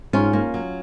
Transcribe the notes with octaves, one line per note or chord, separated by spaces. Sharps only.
G#2 C#4 F4
A#3
F#3